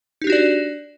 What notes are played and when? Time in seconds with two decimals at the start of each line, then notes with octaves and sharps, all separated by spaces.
0.22 D#4
0.24 G4
0.27 D4
0.30 F#4
0.32 D5